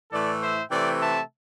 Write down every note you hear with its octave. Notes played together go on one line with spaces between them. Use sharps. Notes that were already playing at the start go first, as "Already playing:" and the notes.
A2 E3 A3 A4 D5
C5 E5
C3 E3 A3 C4 D5 G5
E5 A5